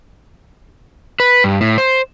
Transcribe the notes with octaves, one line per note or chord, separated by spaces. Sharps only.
B4
G2
A2
C5